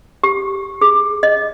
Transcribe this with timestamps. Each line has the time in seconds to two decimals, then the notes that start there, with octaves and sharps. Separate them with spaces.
0.23 G4
0.81 G#4
1.23 D#5